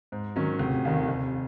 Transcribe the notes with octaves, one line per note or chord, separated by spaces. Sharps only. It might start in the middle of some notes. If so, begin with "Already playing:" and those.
G#2
D#3 F#3 C#4
F1
D#2 D#3
F1